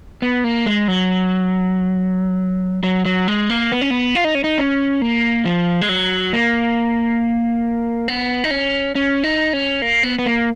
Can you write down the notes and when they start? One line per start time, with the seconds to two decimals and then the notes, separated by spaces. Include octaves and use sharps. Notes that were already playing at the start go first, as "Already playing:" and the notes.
0.22 B3
0.44 A#3
0.66 G#3
0.88 F#3
2.83 F#3
3.05 F#3
3.28 G#3
3.50 A#3
3.72 B3
3.81 C#4
3.90 B3
4.15 F4
4.24 D#4
4.35 C#4
4.44 D#4
4.58 C#4
5.02 A#3
5.45 F3
5.81 G#3
5.89 F#3
6.33 A#3
8.08 B3
8.44 D#4
8.51 C#4
8.95 C#4
9.24 D#4
9.53 C#4
9.82 A#3
10.03 B3
10.19 B3
10.26 A#3